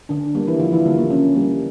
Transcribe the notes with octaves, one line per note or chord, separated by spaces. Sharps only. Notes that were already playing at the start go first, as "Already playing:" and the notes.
D3 D4
G3 A#3
E3 E4
D3 F3 F4
E3 E4
D3 G3 A#3 D4
A#3
C#3 C#4
G3 A#3